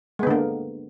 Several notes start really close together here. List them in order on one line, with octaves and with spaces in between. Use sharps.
G#3 B3 D3 A#3